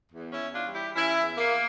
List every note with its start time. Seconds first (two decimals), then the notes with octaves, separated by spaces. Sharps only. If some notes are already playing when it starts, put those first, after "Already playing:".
0.12 E2
0.32 C#4 E4
0.40 E2
0.53 D4 F4
0.67 G3
0.74 E4 G4
0.94 E3 C#4 E4
1.22 E2
1.36 A#3